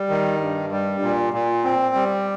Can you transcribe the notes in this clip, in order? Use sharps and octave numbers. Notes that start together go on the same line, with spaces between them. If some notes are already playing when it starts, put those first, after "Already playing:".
Already playing: G3
D#3
G2
G3
A#2
A#2
C4
G3